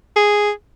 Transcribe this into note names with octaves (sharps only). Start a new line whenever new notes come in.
G#4